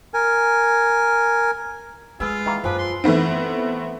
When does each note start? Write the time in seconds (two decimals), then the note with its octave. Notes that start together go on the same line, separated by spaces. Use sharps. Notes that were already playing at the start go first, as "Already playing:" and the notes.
0.14 A#4 G#5
2.20 G#3 F4 G#4 B4 E6
2.46 D#3 E3 A#3
2.64 F#2 F3 B4 G#5 D6
2.78 C6
3.04 E3 A3 B3 C4